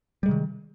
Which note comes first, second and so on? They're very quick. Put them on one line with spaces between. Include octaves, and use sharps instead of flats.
G3 G#3 C3 D#3